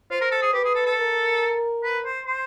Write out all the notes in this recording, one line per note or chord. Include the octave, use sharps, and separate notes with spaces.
F4 C5
A#4
A4
G#4
G4 B4
G#4
A4
A4
A#4
B4
C5
C5